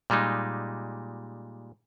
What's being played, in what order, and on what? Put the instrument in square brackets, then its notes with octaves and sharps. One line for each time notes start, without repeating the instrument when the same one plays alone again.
[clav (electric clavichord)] A#2 G3 G#3 D#4